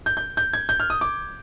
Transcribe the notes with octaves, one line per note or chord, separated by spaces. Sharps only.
G6
G6
G6
G#6
G6
F6
D#6
D6